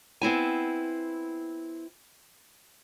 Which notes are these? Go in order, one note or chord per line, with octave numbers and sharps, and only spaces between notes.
B3 C4 E4 G#5